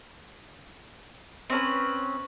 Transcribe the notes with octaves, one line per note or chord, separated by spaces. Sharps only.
C4 C#4 B4